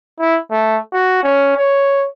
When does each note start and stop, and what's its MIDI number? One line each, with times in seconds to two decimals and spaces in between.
0.19 0.39 64
0.51 0.78 57
0.93 1.20 66
1.23 1.54 61
1.57 2.06 73